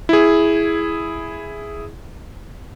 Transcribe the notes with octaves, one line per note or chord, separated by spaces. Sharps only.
E4 G#4